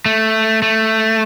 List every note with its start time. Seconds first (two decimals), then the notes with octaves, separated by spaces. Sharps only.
0.06 A3
0.62 A3